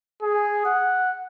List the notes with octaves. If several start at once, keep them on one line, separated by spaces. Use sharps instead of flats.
G#4
F#5